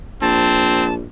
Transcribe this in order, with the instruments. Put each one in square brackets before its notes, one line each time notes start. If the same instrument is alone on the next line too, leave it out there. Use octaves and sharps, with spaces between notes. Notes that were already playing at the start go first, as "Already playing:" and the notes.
[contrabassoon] A#1 [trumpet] C4 [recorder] A5